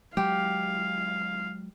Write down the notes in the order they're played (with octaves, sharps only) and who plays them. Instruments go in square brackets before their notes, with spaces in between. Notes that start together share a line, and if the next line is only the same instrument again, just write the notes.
[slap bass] F#3 G#3 [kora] G4 [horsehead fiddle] F5